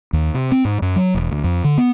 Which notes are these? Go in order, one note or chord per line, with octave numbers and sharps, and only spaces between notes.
D#2
C3
C4
G#2
F#2
F#3
E1
D2
F2
D3
B3